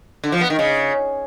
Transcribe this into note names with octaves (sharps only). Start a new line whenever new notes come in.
D3
F3
B3
D#3
C#3